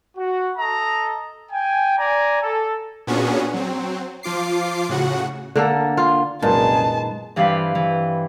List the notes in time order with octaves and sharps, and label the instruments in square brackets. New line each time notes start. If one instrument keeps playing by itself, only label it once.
[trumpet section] F#4
A4 D#5 A#5
G5 G#5
D5 G#5 A#5
A4
[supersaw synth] A#2 B3 C#4 D4 F#4 G#4
F#3 C4
F3 F4 D6 C7
A2 C#3 F#4 F#5
[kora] D3 A#3 A4
F4
[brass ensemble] C2 F#2 G#4 [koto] A#2 [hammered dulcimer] D#3 G#3 B4 [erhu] A5
[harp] G2 E3 C4 G4 F5 B5
E3